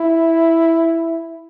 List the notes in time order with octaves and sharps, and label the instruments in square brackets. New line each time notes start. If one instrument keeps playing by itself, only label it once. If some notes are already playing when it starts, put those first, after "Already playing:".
Already playing: [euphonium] E4